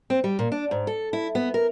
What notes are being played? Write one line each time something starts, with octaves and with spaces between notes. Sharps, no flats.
C4
G3
A#2
D4
G#2
A4
E4
B3
A#4